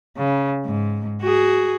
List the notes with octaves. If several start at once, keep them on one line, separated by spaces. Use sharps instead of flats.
C#3
G#2
F#4 G#4